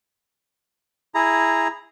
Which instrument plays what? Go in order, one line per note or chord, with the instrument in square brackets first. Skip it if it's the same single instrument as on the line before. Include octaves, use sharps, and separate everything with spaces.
[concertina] E4 G#4 A#5